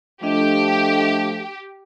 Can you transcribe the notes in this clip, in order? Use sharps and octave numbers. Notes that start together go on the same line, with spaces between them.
F3 A3 D4 G4 D#5 E5